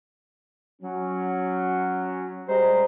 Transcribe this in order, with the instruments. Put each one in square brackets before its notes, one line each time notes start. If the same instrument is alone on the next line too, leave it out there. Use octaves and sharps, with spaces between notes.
[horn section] F#3 C#4
G3 G#3 C5 A#5